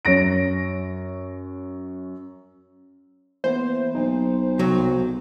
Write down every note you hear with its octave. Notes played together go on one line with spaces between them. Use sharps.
F#2 C#5 A#6 D7
E3 A#3 B3 C5
B1 D#4
C2 F#3